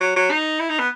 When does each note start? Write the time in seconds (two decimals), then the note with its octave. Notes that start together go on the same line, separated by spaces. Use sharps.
0.01 F#3
0.16 F#3
0.31 D#4
0.60 E4
0.70 D#4
0.80 B3